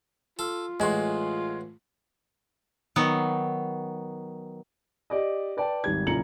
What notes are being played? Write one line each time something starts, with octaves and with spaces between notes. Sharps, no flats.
F4 A4
A1 G#3 F#4 C6
D#3 F#3 B3
G4 D5 D#5
B4 D5 G5 A5
G#1 G3 G#6
F#1 A#2 F4 A#5 C#7 F#7